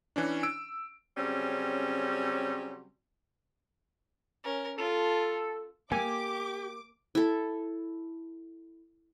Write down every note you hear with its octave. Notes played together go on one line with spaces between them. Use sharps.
E3 C#4 D4
E6 D7
C#3 F#3 G3 C4 C#4
C#4 A#4
F4 A4
A#3 G4 G#5 D6
E4 A4